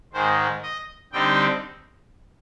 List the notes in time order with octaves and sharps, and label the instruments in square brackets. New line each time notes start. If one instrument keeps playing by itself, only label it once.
[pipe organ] G#2 D#3 G#3 C5
D#5
D3 G3 C4 D#4 G5